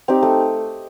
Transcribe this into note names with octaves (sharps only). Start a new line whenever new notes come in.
C4 D#4 G4
A3